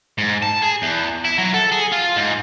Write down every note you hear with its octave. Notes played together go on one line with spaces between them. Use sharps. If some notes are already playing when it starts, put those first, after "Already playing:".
G#2
A5
G#4
E2
E4
F#3
A4
G#4
F4
G#2